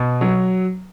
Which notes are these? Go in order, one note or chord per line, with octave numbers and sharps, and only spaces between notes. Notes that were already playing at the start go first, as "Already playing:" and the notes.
Already playing: B2
F#3